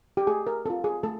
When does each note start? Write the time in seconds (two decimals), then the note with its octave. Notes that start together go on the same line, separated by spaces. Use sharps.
0.17 G4
0.27 A3 G#4
0.47 A#4
0.65 C4 F4 A4
0.84 G#4
1.03 A3 A4